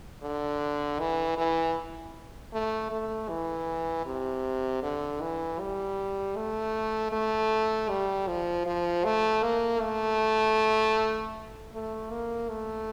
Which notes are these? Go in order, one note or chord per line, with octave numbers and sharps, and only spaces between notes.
D3
E3
E3
A3
A3
E3
C3
D3
E3
G3
A3
A3
G3
F3
F3
A3
A#3
A3
A3
A#3
A3